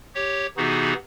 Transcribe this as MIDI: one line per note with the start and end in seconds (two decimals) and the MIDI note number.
0.15 0.47 67
0.15 0.47 73
0.57 0.93 48
0.57 0.93 52
0.57 0.93 59
0.57 0.93 63
0.57 0.93 66
0.57 0.93 68